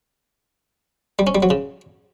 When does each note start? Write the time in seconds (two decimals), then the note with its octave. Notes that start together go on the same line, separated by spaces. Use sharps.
1.19 G3
1.27 C#4
1.35 G3
1.43 F#3
1.50 C#3